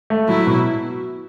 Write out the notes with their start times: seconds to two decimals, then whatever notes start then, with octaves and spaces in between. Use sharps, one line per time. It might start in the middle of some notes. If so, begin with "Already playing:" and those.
0.10 A3
0.29 F#3 E4
0.47 B2